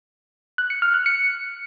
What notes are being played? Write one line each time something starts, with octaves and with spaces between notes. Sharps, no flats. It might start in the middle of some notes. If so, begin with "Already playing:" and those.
F#6
C#7
F6
F#6
C#7